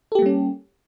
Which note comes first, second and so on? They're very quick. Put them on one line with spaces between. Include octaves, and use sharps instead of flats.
A4 G4 A#3 G3 C#4